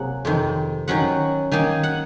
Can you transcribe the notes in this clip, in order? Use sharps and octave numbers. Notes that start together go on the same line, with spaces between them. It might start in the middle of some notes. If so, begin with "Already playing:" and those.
Already playing: C3 F#3 A#3 G#4 F#5
F2 C3 D#3
D#3 F#3 C#4 F#5
D#3 A#3 D#4 G#5
F#5